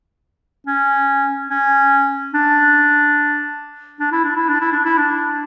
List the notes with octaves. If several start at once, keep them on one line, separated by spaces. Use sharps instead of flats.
C#4
C#4
D4
D4
E4
D4
E4
D4
E4
D4
E4
D4